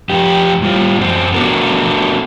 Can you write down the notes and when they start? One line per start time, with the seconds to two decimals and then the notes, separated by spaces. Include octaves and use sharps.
0.10 F2 G4
0.62 A2 G3 F4
0.99 F#2 C4
1.35 A3 B3 D4 F#4 A4 A#4